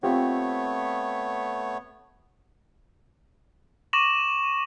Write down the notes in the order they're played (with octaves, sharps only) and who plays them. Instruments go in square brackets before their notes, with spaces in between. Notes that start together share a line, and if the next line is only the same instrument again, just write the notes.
[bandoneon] A3 B3 C#5 [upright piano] C4 F4 G4
[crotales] C#6 D6 A#6 D#7 E7 F#7